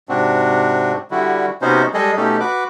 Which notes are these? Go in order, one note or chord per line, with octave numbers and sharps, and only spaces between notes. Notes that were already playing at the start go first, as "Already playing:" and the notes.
G#2 C3 C4 D4 F#4
D3 G3 E4 F#4
C3 B3 C#4 D#4 F#4 C5
G3 G#3 G#4 A4 D#5
B2 A3 C#4 D#4 G4 A4
F#4 B4 D6